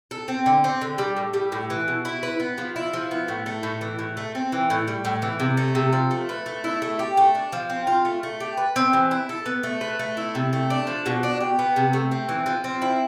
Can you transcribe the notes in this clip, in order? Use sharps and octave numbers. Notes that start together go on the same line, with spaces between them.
A4
C4
D3
C4
D3
G3
A2
G3
A2
E3
B2
E4
B4
B3
F3
E4
F3
B3
A2
A3
A2
E3
A2
A3
C4
E3
A2
G3
A2
E3
C3
A3
C3
F3
A3
B4
A3
E4
A3
G4
A3
D4
F3
C4
F4
A3
A3
G4
B4
C4
E3
E4
A4
B3
A3
B4
A3
E4
C3
A3
D4
F3
B2
D4
G4
B3
C3
A3
C4
E3
F3
C4
E4